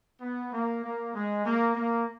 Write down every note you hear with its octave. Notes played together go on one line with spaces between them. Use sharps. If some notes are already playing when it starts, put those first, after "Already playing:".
B3
A#3
A#3
G#3
A#3
A#3